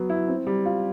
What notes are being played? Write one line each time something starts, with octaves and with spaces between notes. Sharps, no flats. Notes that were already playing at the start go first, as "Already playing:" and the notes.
Already playing: F#3 B3
E4
C4
G3
F4